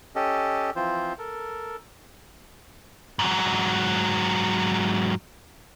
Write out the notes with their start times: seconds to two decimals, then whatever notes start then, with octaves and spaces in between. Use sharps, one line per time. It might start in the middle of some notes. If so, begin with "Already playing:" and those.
0.15 C#4 G4 A4 D#5
0.76 E3 F3 C4 F4 C5
1.18 A4 A#4
3.19 G#2 F#3